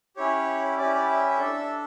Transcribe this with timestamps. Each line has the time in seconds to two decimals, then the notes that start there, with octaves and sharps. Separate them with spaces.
0.17 C#4 E4 G4 C#5
0.77 C#4 E4 G4 D5
0.95 D5
1.08 E5
1.38 D4 A4